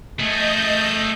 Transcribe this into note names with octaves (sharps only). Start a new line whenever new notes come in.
A3 G#4 D#5 G6